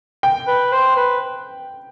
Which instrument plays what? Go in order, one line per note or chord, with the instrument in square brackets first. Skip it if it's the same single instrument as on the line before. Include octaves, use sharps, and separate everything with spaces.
[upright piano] G5
[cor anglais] B4
C5
B4